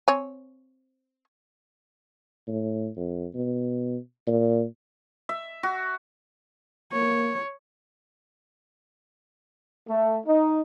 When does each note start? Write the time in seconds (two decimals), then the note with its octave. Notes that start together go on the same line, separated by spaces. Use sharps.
0.08 C4 C#5 G#5
2.48 A2
2.97 F2
3.35 B2
4.27 A#2
5.29 E5
5.63 F#4
6.93 A#3 C#5
9.88 A3
10.27 D#4